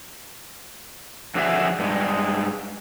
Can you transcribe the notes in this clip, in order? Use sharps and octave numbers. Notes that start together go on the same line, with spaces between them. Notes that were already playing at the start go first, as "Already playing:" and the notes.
F2 D3 F#4 G#4 E5
G2 G#3